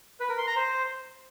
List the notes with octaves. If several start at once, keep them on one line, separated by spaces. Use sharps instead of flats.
B4
A#4
C6
A#5
C5